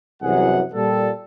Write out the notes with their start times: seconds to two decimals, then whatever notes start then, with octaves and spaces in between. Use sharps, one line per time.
0.22 C2 F#2 E3 F#3 G#4 F#5
0.74 A#2 G3 A4